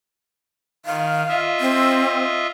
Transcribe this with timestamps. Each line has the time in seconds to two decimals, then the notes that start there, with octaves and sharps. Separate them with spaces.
0.86 D#3 F5
1.29 F4 D#5 E5
1.60 C4